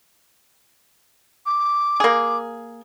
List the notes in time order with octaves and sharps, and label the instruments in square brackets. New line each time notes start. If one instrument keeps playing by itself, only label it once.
[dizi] D6
[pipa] A#3 G#4